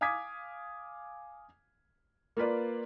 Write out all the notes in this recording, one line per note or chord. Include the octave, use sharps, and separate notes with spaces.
F5 G#5 D6 D#6 G#6 B6
A#3 F4 B4 D5